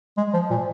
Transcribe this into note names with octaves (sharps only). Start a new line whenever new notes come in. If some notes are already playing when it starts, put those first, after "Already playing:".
G#3
F3
A#2